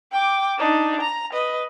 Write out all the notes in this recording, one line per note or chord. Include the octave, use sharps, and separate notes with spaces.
G5 D6
D4 D#4
A#5
B4 D#5